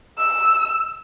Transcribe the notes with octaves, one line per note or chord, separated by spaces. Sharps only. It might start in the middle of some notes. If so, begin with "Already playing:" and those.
E6